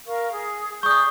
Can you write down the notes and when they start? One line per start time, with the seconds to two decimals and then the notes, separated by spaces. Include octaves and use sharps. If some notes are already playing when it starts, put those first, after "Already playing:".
0.07 A#4 F5 C#6
0.32 G#4
0.83 G#4 D5 C#6 D#6 G6